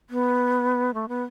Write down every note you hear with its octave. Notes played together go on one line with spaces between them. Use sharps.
B3
A3
B3